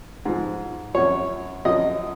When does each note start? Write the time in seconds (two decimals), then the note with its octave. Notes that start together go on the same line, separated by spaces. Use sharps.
0.25 G#2 F3
0.94 F#2 F3 C#5
1.65 F#2 F3 D#5